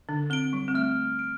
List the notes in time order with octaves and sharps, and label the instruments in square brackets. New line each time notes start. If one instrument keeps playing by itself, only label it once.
[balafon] D3 D4
[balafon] C4 [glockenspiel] D7 G7
[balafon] G3
C4
[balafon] A3 [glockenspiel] F6
[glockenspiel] D7